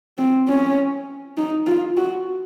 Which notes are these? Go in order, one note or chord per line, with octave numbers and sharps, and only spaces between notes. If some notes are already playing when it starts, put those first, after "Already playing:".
C4
C#4
D#4
F4
F#4